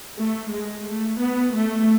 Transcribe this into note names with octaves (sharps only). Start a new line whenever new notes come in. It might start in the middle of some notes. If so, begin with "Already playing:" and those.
A3
G#3
A3
B3
A3